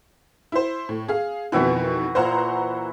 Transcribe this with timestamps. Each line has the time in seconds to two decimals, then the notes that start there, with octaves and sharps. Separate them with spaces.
0.52 E4 C5
0.89 A2
1.08 G#4 F5
1.52 F2 B2 D#3 E3 F#4 E5
2.15 A#2 E3 C5 F#5 A#5